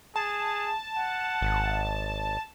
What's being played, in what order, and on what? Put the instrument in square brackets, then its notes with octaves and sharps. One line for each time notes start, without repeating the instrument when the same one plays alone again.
[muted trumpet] G#4 [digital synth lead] A5
[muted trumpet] F#5
[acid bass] G#1